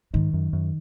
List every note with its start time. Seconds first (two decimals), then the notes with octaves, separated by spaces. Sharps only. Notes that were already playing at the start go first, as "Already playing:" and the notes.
0.13 G#2 D#3
0.34 F#2
0.53 F#2